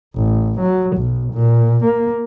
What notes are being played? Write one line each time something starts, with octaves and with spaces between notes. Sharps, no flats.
A1
F#3
B1
A#2
A#3